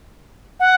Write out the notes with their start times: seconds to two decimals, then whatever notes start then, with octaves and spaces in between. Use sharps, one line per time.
0.59 F#5